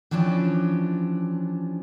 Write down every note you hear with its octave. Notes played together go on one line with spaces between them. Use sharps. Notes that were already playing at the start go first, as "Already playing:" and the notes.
E3 F3 C#4 D4 G4